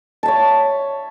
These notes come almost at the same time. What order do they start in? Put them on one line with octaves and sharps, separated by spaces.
A5 E5 C#5